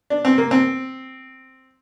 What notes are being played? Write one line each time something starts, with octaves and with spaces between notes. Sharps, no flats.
D4
C4
A#3
C4